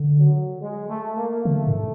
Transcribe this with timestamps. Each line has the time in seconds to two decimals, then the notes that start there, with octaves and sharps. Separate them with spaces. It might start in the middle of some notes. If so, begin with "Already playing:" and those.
Already playing: D3
0.18 F#3
0.61 G#3
0.89 A3
1.17 A#3
1.45 D3 A3
1.67 G#2